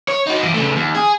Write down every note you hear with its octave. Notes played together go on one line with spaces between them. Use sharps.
C#5
D#4 F#4
G2 E3
C#3 A3
D#2
G#4